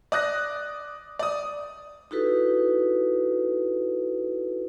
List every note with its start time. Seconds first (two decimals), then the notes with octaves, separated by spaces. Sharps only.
0.12 D5 D#6 F#6 A#6
1.19 D5 D#6
2.11 D#4 E4 F#4 G4 A4 B4